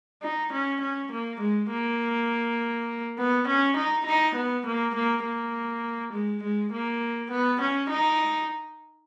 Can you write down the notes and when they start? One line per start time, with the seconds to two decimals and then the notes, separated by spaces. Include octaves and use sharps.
0.22 D#4
0.53 C#4
0.81 C#4
1.12 A#3
1.40 G#3
1.70 A#3
3.18 B3
3.47 C#4
3.77 D#4
4.06 D#4
4.35 B3
4.66 A#3
4.95 A#3
5.24 A#3
6.13 G#3
6.43 G#3
6.72 A#3
7.31 B3
7.61 C#4
7.90 D#4